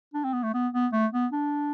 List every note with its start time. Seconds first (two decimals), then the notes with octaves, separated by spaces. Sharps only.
0.14 D4
0.24 C4
0.33 B3
0.43 A3
0.54 B3
0.73 B3
0.93 A3
1.13 B3
1.32 D4